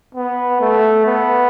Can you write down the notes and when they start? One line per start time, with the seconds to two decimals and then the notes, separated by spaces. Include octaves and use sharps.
0.15 B3
0.61 A3
1.06 B3